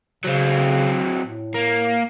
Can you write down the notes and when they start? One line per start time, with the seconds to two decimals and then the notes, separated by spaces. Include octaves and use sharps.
0.24 C#3 F#3 C4
1.22 A2
1.55 A#3